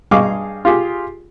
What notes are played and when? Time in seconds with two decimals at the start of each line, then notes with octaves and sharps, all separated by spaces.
0.11 G2 G#4 D#5 F5 C#6 D6
0.65 F4 G4 G#4